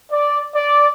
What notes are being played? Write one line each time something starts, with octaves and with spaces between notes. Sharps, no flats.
D5
D5